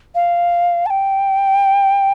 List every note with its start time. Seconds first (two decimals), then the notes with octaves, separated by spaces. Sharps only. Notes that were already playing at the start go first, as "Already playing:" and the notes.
0.15 F5
0.86 A5
0.90 G5